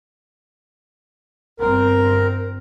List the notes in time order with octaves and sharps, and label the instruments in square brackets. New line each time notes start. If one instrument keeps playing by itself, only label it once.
[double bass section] G1 C4 [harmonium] A#4